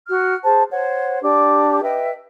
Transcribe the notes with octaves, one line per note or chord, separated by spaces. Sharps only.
F#4 F6
G#4 C5 A5
C5 C#5 F#5
D4 G4 D5 D6
B4 D#5 E5 G5